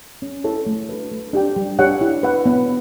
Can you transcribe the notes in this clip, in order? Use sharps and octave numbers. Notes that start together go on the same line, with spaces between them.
C#4
E4 A4 C#5
A3
D4 F#4 B4
A3
D4 G4 D5 G5
G3
D4 G4 C#5 F#5
E4
B4 F#5
B3